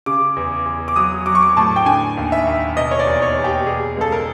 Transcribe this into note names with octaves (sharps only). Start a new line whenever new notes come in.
C#3 D6
E2
E2
D6
F#3 D#6
F#3 D6
C#6
D6
A2 A5
G5
D3 G#5
D#2
E5
D#2
B2 D#5
C#5
D5
E2
C#5
E2
G4
B2 G#4
C#2 A4
A#4